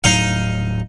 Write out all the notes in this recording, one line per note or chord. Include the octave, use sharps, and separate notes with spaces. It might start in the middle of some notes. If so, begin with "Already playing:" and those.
D#1 A2 F#3 D#4 F5